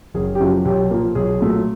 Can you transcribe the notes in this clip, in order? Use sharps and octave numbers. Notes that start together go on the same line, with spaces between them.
F#1 G#4
G4
F#2 C#3 F3 F#4
B1 G4
A#2 F3 A#3
B1 G#4
A#2 F#3 A3